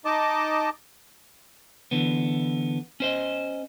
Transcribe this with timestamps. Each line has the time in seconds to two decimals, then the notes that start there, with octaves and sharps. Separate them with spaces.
0.05 D#4 D#5 A5 D6
1.91 D3 E3 B3
3.00 C#4 C5 D#5